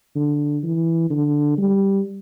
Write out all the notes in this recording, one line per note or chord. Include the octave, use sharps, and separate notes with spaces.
D3
E3
D3
G3